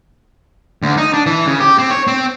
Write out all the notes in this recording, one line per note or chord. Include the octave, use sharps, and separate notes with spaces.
D2
D#4
D4
E3
C#3
G4
C4
C#5
C4